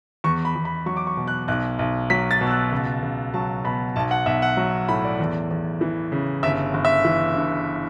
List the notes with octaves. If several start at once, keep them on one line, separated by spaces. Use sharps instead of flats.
E2 C#6
B5
E2
B5
F#3 C#6
D6
C#6
B2
F#6
B1 F#6
B1
F#3 B6
A6
B2
E6
F#6
C#2
C#2
F#3 A5
B2 B5
B1 A5
F#5
B1 E5
F#5
F#3
A2 B5
D5
E2
E2
E3
C#3
G1 E5
G1
E5
E3
G2